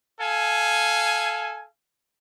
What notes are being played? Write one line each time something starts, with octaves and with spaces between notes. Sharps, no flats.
A4 F5 G#5